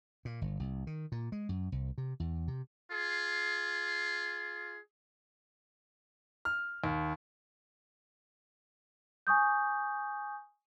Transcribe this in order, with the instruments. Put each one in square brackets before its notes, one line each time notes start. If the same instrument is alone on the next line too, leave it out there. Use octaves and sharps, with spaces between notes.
[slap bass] A#2
G1
C2
D#3
A#2
G#3
F#2
C2
C3
E2
C3
[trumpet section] F4 G#4
[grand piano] F6
D#2
[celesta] G#5 C#6 D#6 G6